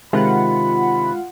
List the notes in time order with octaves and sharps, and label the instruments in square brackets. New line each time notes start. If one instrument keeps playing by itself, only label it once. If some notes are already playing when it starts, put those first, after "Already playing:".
[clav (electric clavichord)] C3 D#3 [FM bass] G#3 [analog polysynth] F4 F#5 [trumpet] B5